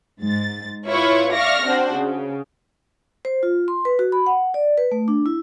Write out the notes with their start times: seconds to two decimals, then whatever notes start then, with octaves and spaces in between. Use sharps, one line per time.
0.22 G#2 A6
0.87 E4 F4 B4 C#5 B5 C#6
1.33 D5 E5 F5 C#6 F6 A#6
1.65 C4 D4 F#4 C5
1.95 C#3
3.25 C5
3.43 F4
3.68 C6
3.85 B4
3.99 F#4
4.12 B5
4.26 F#5
4.54 D5
4.78 B4
4.92 A3
5.08 D4
5.26 E4